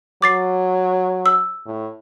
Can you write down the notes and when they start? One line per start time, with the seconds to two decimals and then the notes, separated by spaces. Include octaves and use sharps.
0.22 F#3 D6 A6 C7
1.26 E6
1.66 A2